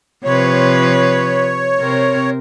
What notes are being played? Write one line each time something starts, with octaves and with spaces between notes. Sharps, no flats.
C3 F3 B4 C#5
C3 C4 A#4